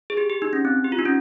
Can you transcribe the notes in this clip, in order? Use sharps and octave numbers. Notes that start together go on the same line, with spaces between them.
G#4
G4
G4
D#4
C#4
C4
G4
F4
D#4
C#4